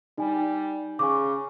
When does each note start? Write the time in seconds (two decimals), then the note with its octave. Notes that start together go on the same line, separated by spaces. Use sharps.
0.18 G3 D#4 G#5
0.99 C#3 G#5 C#6 D6